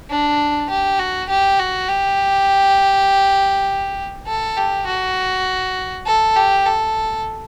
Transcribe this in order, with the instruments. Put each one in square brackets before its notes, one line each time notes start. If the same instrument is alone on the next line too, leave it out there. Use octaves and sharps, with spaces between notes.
[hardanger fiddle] D4
G4
F#4
G4
F#4
G4
A4
G4
F#4
A4
G4
A4